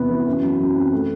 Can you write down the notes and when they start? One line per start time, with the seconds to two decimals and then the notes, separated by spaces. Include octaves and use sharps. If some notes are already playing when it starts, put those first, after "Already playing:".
Already playing: E2 C3 B3 B4
0.10 E3
0.26 F#2
0.42 F#3
0.60 F#2
0.76 C4
0.93 A3